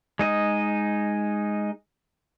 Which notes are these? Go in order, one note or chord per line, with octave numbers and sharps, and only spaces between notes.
G#3 D#4 D#5